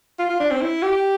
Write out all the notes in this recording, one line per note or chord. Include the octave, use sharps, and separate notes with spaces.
F4
F4
D4
C4
E4
G4